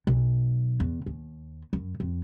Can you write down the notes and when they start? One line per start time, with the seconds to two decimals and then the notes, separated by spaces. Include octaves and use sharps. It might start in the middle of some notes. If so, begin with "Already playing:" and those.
0.07 B1
0.80 E2
1.06 D#2
1.73 F#2
2.00 F2